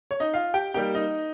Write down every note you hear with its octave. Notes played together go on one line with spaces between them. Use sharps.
C#5
D#4 D#5
F4 F5
G4 G5
G3 A#3 D#4 G4 G5
D#4 D#5